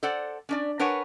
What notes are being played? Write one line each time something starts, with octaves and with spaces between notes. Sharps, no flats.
A4 C5 D5 F#5
C#4 D4 D5
D4 A#4 B4 C#5 F#5 G#5